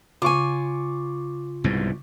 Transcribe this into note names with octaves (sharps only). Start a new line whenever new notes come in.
C#3 F4 G#5 C#6 D6
C2 G#2 B2